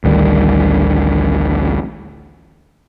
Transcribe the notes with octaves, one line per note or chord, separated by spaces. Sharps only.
A1 D2 D#3 G3